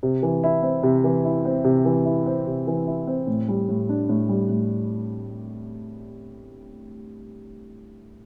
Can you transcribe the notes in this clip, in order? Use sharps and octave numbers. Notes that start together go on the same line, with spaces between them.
C3
E3
E4
C4
C3
E3
E4
C4
C3
E3
E4
C4
C3
E3
E4
C4
A2
G3
A2
D4
A2
G3
A2